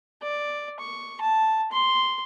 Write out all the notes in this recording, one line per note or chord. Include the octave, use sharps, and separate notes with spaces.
D5
C#6
A5
C6